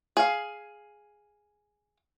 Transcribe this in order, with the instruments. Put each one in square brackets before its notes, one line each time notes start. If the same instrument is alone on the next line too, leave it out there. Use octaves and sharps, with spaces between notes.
[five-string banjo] G#4 F5